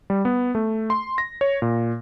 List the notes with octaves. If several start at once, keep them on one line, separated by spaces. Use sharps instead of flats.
G3
B3
A3
C6
A#6
C#5
A#2